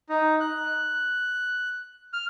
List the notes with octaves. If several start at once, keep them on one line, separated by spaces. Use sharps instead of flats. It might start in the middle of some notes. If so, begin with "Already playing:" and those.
D#4
F#6
F6